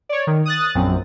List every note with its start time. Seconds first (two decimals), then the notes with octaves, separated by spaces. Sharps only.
0.09 C#5 D5
0.27 D#3
0.45 D#6 F#6 A6
0.75 A#1 F#2 C4